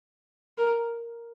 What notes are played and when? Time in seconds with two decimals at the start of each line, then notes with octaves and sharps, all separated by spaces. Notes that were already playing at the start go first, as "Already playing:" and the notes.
0.58 A#4